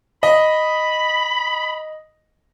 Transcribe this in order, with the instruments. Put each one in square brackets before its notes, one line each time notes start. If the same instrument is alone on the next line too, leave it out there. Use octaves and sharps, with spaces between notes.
[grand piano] D#5 [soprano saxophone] B5